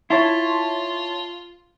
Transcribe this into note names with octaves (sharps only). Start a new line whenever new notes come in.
E4 F4 C#5 A5 C6